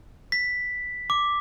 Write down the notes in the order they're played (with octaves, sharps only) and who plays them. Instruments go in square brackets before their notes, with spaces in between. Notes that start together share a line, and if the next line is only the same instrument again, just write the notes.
[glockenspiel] B6
D6